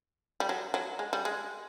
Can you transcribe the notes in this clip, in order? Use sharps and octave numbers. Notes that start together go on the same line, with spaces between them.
G3
F#3
F#3
G#3
G3
G#3